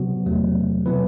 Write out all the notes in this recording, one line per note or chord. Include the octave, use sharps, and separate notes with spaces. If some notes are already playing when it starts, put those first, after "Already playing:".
Already playing: C3 F#3 B3 F#4
E2 C3 F#3 A3
B2 F#3 B3 E4 B4